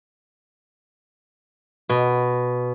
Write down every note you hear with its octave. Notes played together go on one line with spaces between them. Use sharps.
B2